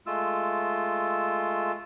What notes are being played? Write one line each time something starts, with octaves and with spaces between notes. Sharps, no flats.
G#3 A3 F4 E6